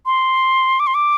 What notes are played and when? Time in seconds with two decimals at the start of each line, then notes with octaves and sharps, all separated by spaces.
0.06 C6
0.80 D6
0.87 C6
0.95 D6